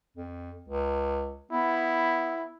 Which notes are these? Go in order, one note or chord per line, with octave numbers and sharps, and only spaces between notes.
F2
C#2
B3 E4